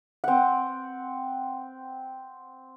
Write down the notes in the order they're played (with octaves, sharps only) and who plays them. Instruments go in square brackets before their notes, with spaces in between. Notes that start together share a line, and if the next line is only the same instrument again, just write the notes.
[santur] C4 F#5